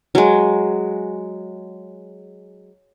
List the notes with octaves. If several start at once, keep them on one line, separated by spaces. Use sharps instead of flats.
F#3 G#3